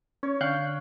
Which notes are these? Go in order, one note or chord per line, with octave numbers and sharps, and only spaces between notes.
C#4 C#5
D3 F5 G5 C#6 F#6 G6